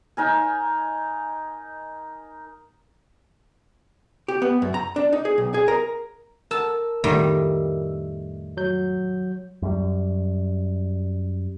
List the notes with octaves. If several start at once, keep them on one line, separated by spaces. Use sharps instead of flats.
D#4 A#4 G#5
G4
B3
F#2
A#5
D4
D#4
G#4
B1
G#4
A#4
A#4 A5 E6
F2 A2 D#3 G3 A3
F#3 G6
F#2 G3